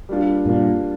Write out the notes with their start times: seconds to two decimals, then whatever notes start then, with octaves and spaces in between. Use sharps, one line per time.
0.09 G3 A#3 D4 F4
0.45 G2 A#2 G3 A#3 D4 F4